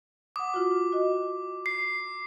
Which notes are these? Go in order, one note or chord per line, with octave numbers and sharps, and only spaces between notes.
F#5 D6 D#6
F4 F#4
F#4 D#5
C7